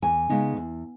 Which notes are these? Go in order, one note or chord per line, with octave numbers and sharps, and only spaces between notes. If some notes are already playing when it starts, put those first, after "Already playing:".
E2 G#5
C#3 G#3 B3 D#4
E2